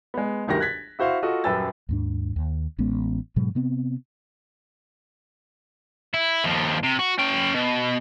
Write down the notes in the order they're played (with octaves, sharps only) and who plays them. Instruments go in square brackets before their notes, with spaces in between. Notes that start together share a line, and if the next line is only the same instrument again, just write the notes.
[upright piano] G#3 B3
G1 D2 D#3 G4 A#6
F#6 G#6 A6 B6
E4 F#4 C5 E5 F5
F4 F#4 A4 D#5
D#1 F#2 B4 G5 E6 A6
[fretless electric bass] D#2 G#2 D4
D#2
A1 G#3 B3 C#4
G#2 B2 F#3 G#3
C3 B3 C4
[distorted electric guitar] E4
D#2 F3
C3
F#4
C#4 G5
B2